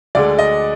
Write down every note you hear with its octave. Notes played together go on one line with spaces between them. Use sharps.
D2 D3 G#3 D5
D#5